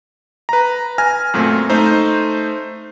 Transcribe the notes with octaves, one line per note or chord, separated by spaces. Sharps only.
B4 A#5
G#5 F6 A#6
F#2 A#2 A3 C4
A3 D#4 C5